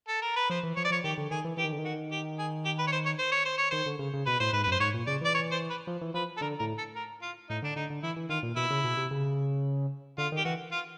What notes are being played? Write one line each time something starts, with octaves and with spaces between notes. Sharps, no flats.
A4
A#4
B4
F3 C5
E3
F3 C#5
D5
F3 C#5
D#3 G4
D3
D#3 G#4
E3
E3 G4
D#3
D3
D#3
F#4
G4
G#4
G4
B4
C#5
C5
C#5
C5
C#5
C5
C#5
D#3 C5
D3
C#3
C#3
B2 B4
A2 C5
G#2 B4
F#2 B4
C5
G#2 C#5
A#2
C#3 D5
E3 D5
C#5
C5
B4
F3
E3
F3 B4
A4
D3 A#4
A2 A#4
A4
A#4
F4
A2 D#4
D3 D4
D3 D#4
D3
E3 E4
E3
D#3 F4
A#2
B2 E4
C#3
B2
C3
C#3
D3 F4
D#3
G4
E3 F#4
F4